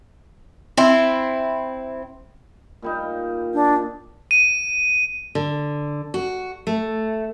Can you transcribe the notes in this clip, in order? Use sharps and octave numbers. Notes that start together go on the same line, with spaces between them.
C4 E4
A#2 G3 D#4
D4
D#7
D3
F#4
A3